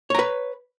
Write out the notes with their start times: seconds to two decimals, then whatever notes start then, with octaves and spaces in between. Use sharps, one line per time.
0.10 C#5
0.15 A#5
0.19 B4